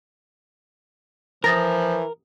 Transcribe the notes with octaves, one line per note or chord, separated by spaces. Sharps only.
E3 F3 A#4 D#6 A6 A#6